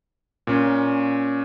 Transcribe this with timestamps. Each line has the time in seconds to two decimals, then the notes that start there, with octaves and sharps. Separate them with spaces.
0.47 A#2 C#4